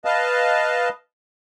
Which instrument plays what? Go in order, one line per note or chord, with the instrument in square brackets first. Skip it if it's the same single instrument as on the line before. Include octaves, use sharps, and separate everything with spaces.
[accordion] B4 D#5 F5 A5